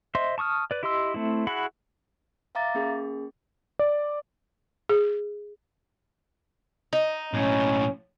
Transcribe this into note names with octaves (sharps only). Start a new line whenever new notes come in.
C5 D#5 E5 C6
A5 C#6 D#6 F6
B4 D5
E4 G4 D#5 C6 E6
A3 C4 E4
E4 F#4 G#4 F#5 B5
E5 F5 A#5 D6 A6
A#3 C#4 G#4
D5
G#4
D#4
B1 A2 C#4